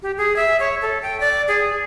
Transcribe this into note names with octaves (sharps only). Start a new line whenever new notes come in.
G4
G#4
E5
C#5
A4
G5
D5
G#4